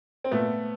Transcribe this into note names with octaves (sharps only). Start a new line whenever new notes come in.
C4
A#2 A3 B3